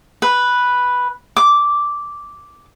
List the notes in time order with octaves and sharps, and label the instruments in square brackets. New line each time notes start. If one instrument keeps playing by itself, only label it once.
[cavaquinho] B4
D6